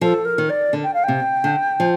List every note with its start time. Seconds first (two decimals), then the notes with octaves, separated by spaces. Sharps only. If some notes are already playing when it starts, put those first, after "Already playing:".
0.01 F3 A4
0.25 A#4
0.38 D#3
0.50 D5
0.73 D3
0.84 G5
0.94 F5
1.04 C3 G5
1.44 D3
1.80 F3